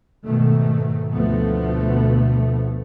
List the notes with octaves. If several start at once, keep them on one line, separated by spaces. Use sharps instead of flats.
G#2 B2 D#3 A3
D2 B2 F3 A3 B3